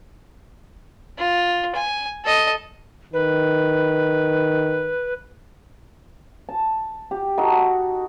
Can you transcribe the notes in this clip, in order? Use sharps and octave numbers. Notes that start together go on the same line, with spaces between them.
F4
G#5
A4 D#5
D#3 B4
A5
G4
D#4 F#4 A4